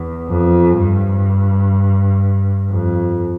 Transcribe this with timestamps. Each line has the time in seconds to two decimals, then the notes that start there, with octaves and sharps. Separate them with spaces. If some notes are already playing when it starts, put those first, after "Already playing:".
Already playing: E2
0.29 F2
0.78 G2
2.70 F2